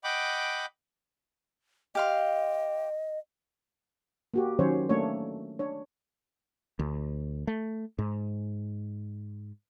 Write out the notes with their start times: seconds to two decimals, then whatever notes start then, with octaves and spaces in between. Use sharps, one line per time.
0.04 D#5 F#5 G5 B5 D6
1.95 G4 D#5 F5 C6
4.34 A#3 F#4 G4
4.59 D#3 F#3 C#4 C5 C#5
4.89 A3 A#3 D4 C#5
5.59 D4 C#5
6.79 D2
7.47 A3
7.99 G#2